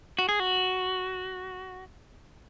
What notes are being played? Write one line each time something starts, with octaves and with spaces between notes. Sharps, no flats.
F#4
G#4
F#4